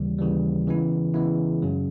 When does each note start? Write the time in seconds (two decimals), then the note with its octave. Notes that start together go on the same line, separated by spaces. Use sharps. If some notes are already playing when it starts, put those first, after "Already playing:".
Already playing: D#2 C#3 E3 G3
0.18 D#2 C#3 E3 G3
0.67 C#3 E3 G#3 B3 E4
1.14 C#3 E3 G#3 B3 E4
1.62 F#2 C#3 F#3